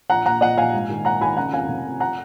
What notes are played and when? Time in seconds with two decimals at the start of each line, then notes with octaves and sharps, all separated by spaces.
0.10 A#1 F#5 A#5
0.26 A#2 F#5 A#5
0.41 A#2 D#5 F#5
0.57 A#1 F5 G#5
0.74 G#2
0.90 D#3
1.05 A#1 F#5 A#5
1.21 D#3 G#5 B5
1.37 C#3 F#5 A#5
1.53 F2 F5 G#5
1.68 F1
1.85 F2
2.00 F#5 A#5